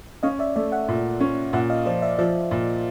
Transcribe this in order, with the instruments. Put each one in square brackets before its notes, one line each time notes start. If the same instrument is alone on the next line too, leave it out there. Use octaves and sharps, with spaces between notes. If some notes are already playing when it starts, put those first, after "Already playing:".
[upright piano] C#4 [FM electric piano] D#5 F5
[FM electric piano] D5 E5
[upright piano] A3 [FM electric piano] D5 E5
[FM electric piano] E5 F#5
[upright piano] A#2
C#4
[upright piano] A#2 [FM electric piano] E5 F#5
[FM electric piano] D#5 F5
[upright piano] F3 [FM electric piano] C5 D5
[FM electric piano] D5 E5
[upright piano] F3 [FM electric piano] D5 E5
[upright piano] A#2